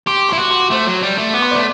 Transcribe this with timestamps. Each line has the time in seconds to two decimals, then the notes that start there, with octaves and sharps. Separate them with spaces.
0.07 G4 C6
0.17 D6
0.29 E4 C6
0.39 F#4 D6
0.51 C6
0.61 D6
0.70 A3 C5 C6
0.86 F#3
1.02 G3
1.18 A3
1.34 B3 D6
1.42 C6
1.51 A3 D5 D6